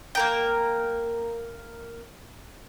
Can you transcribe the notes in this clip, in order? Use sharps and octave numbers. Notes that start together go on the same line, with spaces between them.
A#3 A#4 G5